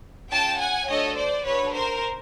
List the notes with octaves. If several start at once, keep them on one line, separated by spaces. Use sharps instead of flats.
C#4 F4 G#4 G5 A5
F#5 G#5
A3 D4 F#4 A4 C#5 D#5
C5 D5
D4 F#4 A4 B4 C#5
A#4 C5